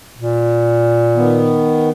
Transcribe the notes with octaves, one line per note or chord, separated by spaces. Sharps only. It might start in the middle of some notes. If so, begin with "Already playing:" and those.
A#2
D#3 B3